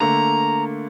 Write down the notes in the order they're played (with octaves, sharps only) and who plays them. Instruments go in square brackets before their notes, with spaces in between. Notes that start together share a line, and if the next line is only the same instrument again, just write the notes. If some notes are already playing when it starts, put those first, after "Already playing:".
[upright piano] D3 A3 A#3 [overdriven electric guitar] A#5